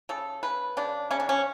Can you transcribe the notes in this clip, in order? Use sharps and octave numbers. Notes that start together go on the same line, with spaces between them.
C#3 A4
C#3 B4
C#3 D4
C#3 C#4
D4
C#4